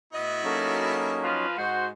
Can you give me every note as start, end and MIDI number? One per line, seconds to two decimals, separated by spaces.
0.13 0.40 45
0.13 1.23 59
0.13 1.23 64
0.13 1.23 66
0.13 0.40 75
0.44 1.46 54
0.44 1.28 58
0.44 1.46 61
0.44 1.46 63
0.44 1.28 68
0.44 1.28 69
1.23 1.56 53
1.23 1.56 65
1.23 1.56 71
1.58 1.90 44
1.58 1.90 56
1.58 1.86 66
1.58 1.86 72